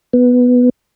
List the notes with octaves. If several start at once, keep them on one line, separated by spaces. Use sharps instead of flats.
B3